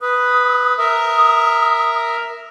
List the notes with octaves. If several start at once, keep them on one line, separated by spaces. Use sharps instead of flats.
B4 D#6
A#4 E5 D#6